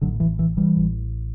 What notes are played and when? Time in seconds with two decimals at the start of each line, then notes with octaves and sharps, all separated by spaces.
0.01 A1 A2 D3 F#3
0.20 E3
0.39 E3
0.57 E3 G3
0.77 A1 A2